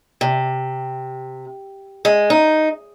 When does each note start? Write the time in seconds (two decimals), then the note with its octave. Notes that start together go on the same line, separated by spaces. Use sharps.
0.21 C3
2.05 G#3
2.30 D#4